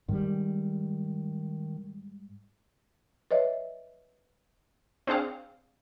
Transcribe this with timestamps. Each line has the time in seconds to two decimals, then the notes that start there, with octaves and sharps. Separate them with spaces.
0.08 G#2 D#3 G3
3.31 B4 C#5 D#5 E5
5.07 C4 D4 G#4 F5